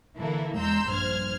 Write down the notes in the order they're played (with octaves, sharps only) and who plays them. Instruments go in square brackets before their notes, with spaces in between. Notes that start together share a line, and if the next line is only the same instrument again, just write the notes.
[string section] D3 E3 A#3 E4 A4
E2 G#3 A#5 C6 E6 G6
A#1 G2 C5 F6 G#6